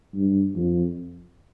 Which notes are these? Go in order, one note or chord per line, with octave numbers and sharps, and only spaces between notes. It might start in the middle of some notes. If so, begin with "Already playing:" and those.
G2
F2